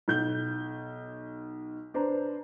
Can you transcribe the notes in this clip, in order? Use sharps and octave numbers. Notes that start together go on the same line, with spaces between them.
B1 G6 G7
D4 B4 C5 A#5